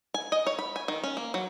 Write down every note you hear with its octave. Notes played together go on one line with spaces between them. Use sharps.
G#5
D#5
C#5
B5
G#5
D#3
C#4
A#3
F#3